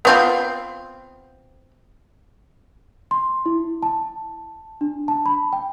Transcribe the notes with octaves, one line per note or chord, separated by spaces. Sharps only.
B3 C4 F4
C6
E4
A5
D4
A5
B5
G5